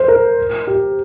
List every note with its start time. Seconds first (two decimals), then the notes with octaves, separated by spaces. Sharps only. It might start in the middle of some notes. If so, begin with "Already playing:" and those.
Already playing: C5
0.08 A#4
0.67 G4